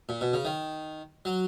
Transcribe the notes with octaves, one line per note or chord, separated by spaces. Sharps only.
A#2
B2
C#3
D#3
F#3